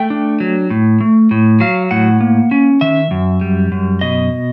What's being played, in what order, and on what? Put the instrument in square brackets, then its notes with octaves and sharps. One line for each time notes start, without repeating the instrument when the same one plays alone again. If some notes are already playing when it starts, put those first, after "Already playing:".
Already playing: [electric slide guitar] A3 G5
D4
F#3
A2
A3
A2
F#3 F5
A2 F#5
A#3
C#4
D#3 E5
F#2
G3
F#2
B2 D#5